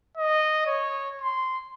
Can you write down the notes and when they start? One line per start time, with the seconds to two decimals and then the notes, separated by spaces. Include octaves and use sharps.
0.17 D#5
0.66 C#5
1.21 C6